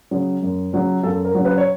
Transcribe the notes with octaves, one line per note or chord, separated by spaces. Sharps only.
C#3 F#3
F#2
C#3 F#3
F#2 A4
A#4
C#3 F#3
B4
C#5